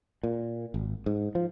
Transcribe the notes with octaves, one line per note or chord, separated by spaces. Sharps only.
A#2
G#1
G#2
F3